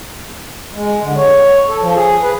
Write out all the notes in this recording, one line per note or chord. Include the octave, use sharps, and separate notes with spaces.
G#3
D3
C#5
A4
F3
G#4
B4